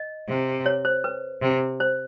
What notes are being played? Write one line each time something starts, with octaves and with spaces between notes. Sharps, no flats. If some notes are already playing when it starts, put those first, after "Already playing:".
Already playing: D#5
C3
C#5
C5
B4
C3
C5